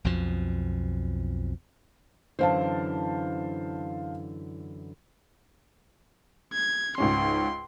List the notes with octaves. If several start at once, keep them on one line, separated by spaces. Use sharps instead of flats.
B1 F2 B2 F3
F#2 D3 E3 C5 F5 A5
G#6
C#2 G#2 C#4 C6